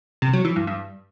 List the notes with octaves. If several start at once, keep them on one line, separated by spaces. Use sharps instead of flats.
C3
F#3
E3
G2
G2